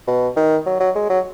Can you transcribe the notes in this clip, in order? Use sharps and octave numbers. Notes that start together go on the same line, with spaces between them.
B2
D#3
F#3
F#3
G#3
F#3